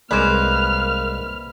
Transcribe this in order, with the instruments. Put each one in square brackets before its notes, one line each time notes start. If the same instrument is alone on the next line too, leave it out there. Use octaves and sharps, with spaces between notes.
[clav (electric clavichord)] C2 G#3 D5 [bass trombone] A#3 [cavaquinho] B4 C5 [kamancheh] F6